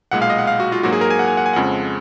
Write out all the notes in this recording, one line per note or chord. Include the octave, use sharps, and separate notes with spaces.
B1 A#2 G#3 F#5
F5
D#5
F#5
F5
F#4
F4
G#2 F#3 A#3 F#4
G#4
A#4
G#5
F#5
G#5
F#5
G#5
F2 C#3 F3 G#3 F#5